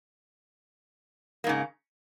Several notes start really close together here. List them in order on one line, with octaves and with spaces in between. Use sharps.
A#3 G#2 C#3